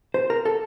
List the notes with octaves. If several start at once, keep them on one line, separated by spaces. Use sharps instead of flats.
C5
A#4
A4